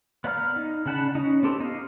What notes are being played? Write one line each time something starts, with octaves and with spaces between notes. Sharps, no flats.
B3 D5 F5 A#5 F6
D#4
C#3 D4 F#5 A5 B5
C#4 D#4
B3 C4 G4 A4
D#4 F5